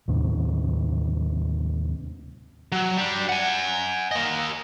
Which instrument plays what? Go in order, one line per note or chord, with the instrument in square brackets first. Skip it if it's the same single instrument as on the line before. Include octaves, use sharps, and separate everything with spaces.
[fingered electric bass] D#2 A2 C3
[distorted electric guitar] F#3
G3 D4
F#5 G#5
A#3 D#5